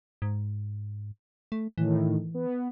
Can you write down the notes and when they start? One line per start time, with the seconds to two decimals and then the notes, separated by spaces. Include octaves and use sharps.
0.22 G#2
1.52 A3
1.78 A2 D#3 E3
2.34 B3